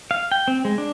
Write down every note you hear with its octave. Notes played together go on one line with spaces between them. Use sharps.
F5
G5
C4
G#3
D4